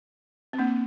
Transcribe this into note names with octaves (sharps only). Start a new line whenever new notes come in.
C4
A#3 D4